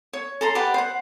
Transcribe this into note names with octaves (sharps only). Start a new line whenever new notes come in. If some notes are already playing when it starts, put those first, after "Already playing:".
C#5
A4 A#5 C6
G4 B4 D5 F#5
C5 F#5